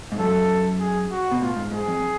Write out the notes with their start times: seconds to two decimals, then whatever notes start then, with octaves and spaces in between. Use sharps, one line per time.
0.12 G#2
0.19 F#2 A4
0.80 G#4
1.11 F#4
1.31 B2
1.41 A2 F4
1.56 G#2
1.71 G#2 G#4
1.88 F2